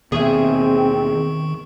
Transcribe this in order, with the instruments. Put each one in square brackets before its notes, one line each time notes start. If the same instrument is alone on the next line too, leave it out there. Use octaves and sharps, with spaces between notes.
[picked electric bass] D#2 B2 [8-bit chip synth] D#3 C#6 [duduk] C4 [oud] G#4 E5